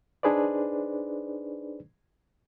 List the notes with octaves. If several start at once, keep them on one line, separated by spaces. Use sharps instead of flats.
D4 D#4 G#4 B4 C5 D5